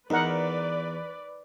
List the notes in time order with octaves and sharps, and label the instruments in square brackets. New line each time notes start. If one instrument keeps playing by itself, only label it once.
[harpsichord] E2 [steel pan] D#4 A#4 F#5 [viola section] B4 D5